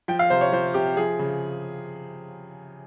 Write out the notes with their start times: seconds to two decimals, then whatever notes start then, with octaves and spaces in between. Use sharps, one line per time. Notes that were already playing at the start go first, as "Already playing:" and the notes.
0.08 F3 G5
0.19 F5
0.30 C3 C5
0.41 C#5
0.52 F3 C5
0.74 C3 G4
0.97 F3 G#4
1.19 C#3